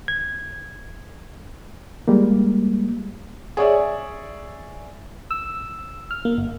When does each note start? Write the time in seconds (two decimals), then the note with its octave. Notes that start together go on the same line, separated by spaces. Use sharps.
0.08 G#6
2.08 G3 G#3 A#3
3.57 G#4 C#5 D5 E5
5.31 E6
6.11 F6
6.25 A#3
6.38 G1